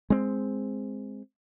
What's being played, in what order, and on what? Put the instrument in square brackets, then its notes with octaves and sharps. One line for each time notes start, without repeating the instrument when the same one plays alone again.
[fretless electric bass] G#3 C4